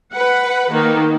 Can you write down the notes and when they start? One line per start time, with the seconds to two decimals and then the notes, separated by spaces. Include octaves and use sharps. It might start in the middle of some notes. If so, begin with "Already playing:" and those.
0.13 B4 F#5
0.71 D#3 A#3